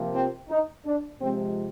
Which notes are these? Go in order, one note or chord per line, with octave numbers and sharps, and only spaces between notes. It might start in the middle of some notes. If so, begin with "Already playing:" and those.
Already playing: C3 F3 A#3
C4
D#4
D4
C3 F3 G#3 C4